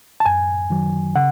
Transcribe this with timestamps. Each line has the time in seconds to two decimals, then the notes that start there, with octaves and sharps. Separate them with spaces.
0.20 A5
0.26 F#2 G#5
0.70 D#3 F#3
1.16 C#3 F#5